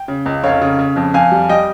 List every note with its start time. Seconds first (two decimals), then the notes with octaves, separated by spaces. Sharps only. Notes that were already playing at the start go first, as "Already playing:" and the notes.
Already playing: G5
0.08 C#3
0.26 C#2
0.44 F1 C#5 F5
0.61 C#3
0.79 C#3
0.96 F2
1.14 F2 F5 G#5
1.32 G3
1.49 G3 D#5 G5